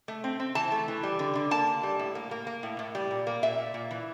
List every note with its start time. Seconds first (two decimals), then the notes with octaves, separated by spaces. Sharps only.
0.08 A3
0.24 C4
0.40 C4
0.55 E3 A5
0.72 A3
0.88 E3
1.03 G3
1.19 D3
1.35 D3
1.51 A#3 A5
1.67 D3
1.83 G3
1.99 A2
2.15 A#3
2.31 A#3
2.47 A#3
2.63 A2
2.79 A2
2.95 G3
3.11 A#2
3.27 A#3
3.43 A#2 E5
3.58 A#2
3.74 A#2
3.91 E3